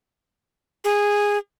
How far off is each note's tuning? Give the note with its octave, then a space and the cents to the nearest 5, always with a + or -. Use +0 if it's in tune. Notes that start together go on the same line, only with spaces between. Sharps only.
G#4 -15